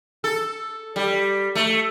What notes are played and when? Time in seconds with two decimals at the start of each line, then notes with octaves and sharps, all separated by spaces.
0.24 A4
0.96 G3
1.55 A3